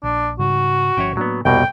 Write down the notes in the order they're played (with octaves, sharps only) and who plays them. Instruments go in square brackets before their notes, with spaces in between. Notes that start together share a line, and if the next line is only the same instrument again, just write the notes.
[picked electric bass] A#1 [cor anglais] D4
[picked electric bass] G#2 C#3 G3 [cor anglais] F#4
[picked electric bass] G1 F3 C#4 [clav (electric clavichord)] C#5 E5 G5
[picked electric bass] A2 A#3 D4 [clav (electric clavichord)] F#3 B3
[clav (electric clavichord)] C2 B2 A#3 [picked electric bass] F2 G3 B3 [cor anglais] G5